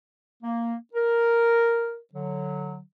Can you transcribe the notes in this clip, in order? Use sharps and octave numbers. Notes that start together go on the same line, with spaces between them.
A#3
A#4
D3 F#3